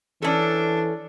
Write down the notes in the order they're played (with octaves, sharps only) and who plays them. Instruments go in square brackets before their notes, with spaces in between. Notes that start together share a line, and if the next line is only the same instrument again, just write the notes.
[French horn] E3 [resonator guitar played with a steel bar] C#4 A4 [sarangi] D4